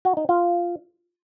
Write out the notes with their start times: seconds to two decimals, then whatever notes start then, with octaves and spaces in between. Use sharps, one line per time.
0.05 F#4
0.17 D#4
0.29 F4